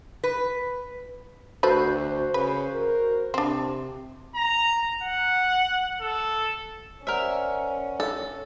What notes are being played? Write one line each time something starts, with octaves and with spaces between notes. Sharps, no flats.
B4
D2 F#4 A4 B4 C5
C#3 B4
A#4
C3 C4 D4
A#5
F#5
A4
C#4 A#4 C5 D5 E5 F#5
A4